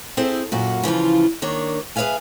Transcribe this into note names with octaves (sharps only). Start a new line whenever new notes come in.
C4 E4 G#4 A4 C5
F#2 A#2 F#4
C#3 E3 F3 F4
D#3 A#3 D4 C#5
G#4 B4 C5 E5 F5 G#5